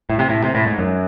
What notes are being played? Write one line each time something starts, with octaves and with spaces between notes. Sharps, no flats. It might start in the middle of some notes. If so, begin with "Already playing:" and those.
A2
C3
A2
C3
A2
G#2
F#2